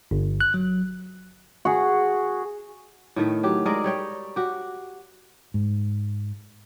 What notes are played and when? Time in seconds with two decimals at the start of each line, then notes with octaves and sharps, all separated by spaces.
0.11 G1
0.41 F#6
0.54 F#3
1.65 F#4 G#4
3.16 A2 D#3 A3
3.43 F#3 G4
3.66 G#3 A#4 D5 D#5
3.84 G3 C#5 G5
4.36 F#4 G4
5.54 G#2